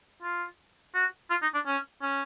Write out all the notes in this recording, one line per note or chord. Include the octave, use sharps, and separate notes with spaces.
F4
F#4
F4
D#4
D4
C#4
C#4